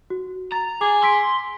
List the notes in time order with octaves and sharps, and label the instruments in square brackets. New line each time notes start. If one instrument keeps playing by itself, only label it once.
[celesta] F#4
[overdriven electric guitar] A#5 [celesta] A6
[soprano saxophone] G#4 [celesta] D6
[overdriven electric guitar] C6 [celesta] E6 B6 D7